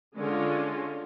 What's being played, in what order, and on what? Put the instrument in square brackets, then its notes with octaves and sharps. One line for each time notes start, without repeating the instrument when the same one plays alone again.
[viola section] D3 G#3 C#4 F4